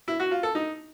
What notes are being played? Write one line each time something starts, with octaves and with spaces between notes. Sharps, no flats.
E4
F#4
F4
A4
D#4